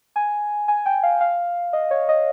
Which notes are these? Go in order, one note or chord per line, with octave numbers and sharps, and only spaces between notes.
G#5
G#5
G5
F5
F5
D#5
C#5
D#5